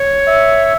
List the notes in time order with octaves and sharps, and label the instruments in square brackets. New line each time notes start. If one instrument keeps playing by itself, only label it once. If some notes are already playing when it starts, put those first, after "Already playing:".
Already playing: [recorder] C#5
[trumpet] E5